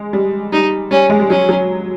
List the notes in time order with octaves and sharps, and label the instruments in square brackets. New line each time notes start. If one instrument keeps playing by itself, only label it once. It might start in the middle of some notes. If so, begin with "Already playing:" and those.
Already playing: [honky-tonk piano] G#3
G3
[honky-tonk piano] G3 [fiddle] D#4
[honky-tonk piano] G3 [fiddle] C#4
[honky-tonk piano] G#3
G3
[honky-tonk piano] F#3 [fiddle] C#4
[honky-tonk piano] F#3